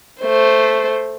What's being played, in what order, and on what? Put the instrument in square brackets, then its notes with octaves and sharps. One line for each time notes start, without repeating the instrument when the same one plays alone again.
[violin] A3 C5